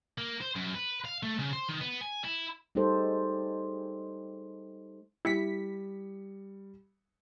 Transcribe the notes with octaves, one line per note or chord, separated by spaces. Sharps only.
A#3
C5
F#2
B4
F5
A3
C#3
C5
D#3
B3
G#5
E4
G3 G#3 D#4 G4 A4 C5
G3 E4 B6 C#7